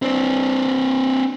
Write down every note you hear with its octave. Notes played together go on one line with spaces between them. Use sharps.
C4 D4